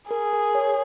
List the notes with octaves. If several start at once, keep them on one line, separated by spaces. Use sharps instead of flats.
G#4 A#4
A#4
C#5